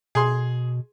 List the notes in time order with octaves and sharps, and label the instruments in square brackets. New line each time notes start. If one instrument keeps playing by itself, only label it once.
[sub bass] B2 [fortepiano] G#4 C6